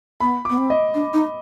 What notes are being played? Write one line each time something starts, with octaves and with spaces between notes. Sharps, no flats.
B3 B5
B3 D6
C4
D#5
D4
D#4